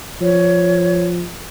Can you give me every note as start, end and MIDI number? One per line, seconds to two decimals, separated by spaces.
0.21 1.25 53
0.21 1.03 73